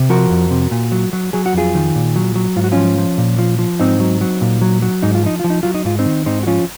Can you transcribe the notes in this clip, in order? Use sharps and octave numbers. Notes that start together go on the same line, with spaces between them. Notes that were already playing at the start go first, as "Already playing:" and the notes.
Already playing: C3
F3 F#4 A#4
F2
C3
A#2
F#3
F#3
F#3 G#4
F#4
F2 F4 G#4
D#3
A#2
F#3
F#3
G#2 F4
F#4
F3 C#4 F4
F3
A#2
F3
F3
G#2 C4 D#4
F#3
F#3
A#2
F#3
F#3
G#2 D#4
F4
F3 D#4
F3 F4
D#4
F#3 F4
D#4
G#2 F4
C4 D#4
D#3
G#2 C4 D#4
F#4
F3 C#4 F4